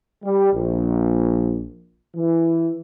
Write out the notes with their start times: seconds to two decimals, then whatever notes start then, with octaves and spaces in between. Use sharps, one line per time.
0.24 G3
0.54 A#1
2.16 E3